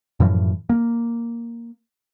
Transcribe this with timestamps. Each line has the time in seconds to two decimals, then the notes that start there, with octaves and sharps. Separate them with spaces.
0.20 F#2 A2 E3 F3
0.69 A#3